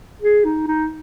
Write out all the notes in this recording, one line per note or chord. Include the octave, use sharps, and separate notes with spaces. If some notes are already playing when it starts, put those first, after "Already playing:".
G#4
D#4
D#4